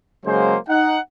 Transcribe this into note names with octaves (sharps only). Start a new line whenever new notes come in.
C#3 F#3 G#3 A#3 C5
D#4 F#5